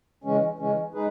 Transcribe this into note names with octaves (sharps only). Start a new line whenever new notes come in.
C#3 E3 G#3 C#4
C#3 E3 G#3 C#4
G#3 D#4 G#4 B4